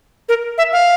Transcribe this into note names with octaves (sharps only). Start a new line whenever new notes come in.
A#4
E5
F5